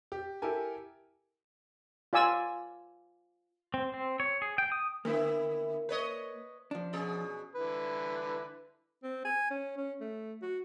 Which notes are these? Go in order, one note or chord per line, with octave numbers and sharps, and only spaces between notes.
G4
E4 G4 A4 A#4 G#5
F4 D5 G#5 E6
C4
C4
C#5
G#4
G5
D#6
D3 A#3 B3 E4
B4 C#5 D#5
F3 D4
B2 C#4 G#4
D3 E4 B4
C4
G#5
C#4
C#4
A3
F#4